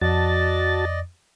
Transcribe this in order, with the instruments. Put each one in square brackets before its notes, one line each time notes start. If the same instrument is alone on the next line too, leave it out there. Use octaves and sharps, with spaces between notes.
[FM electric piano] F2 [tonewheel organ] F#4 A5 A6 [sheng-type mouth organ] D5 D#5